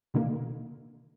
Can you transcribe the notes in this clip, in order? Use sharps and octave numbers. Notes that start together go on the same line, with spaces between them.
B2 D3 D#3 A#3